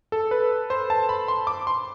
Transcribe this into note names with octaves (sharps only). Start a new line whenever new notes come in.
A4
B4
C5
A5
B5
C6
D6
C6